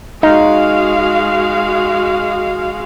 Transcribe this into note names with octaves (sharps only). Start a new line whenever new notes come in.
G#3 D#4 F#4 F5